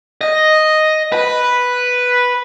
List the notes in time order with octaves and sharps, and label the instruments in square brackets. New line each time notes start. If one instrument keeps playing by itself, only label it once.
[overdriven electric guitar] D#5
B4